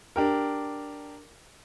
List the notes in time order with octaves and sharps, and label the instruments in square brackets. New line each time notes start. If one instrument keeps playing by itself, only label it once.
[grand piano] D4 G4 A#4